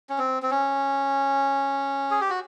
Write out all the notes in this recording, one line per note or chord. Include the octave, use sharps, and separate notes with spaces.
C#4
C4
C4
C#4
G#4
G4
F#4